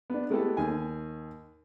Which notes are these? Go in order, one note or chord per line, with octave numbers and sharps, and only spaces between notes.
B3 D4
G#3 A3 B3 E4 G4 A4
D#2 G#5